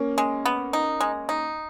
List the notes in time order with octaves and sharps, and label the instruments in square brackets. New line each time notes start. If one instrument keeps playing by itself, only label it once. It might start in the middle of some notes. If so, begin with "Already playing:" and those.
Already playing: [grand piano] A#3 C#4
[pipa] G#3
B3
D#4
G#3
D#4